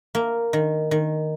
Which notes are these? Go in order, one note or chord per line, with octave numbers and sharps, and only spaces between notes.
A#3
D#3
D#3